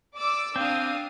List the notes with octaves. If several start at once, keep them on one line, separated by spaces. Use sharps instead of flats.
D5 D6 E6
C4 D4 F5 D#6